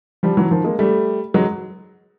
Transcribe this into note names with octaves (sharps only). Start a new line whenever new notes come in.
F3 G3
E3 F#3
D#3 F3
G#3 A#3
G3 A3
F#3 G#3